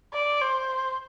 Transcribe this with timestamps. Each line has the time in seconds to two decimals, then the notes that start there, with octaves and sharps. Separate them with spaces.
0.13 D5
0.41 C5